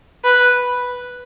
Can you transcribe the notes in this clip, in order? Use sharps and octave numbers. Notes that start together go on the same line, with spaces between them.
B4